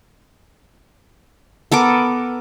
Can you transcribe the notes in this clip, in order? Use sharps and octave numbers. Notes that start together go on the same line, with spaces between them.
B3 A4 A#4 D6